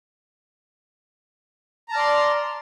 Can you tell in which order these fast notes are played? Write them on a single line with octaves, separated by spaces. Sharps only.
A#5 A5 F6 D5 C6